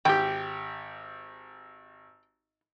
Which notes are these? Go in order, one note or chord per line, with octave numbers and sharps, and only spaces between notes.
G#1 G4 G5